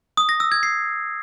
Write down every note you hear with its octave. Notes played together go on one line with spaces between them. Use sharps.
D#6
A#6
E6
G#6
C7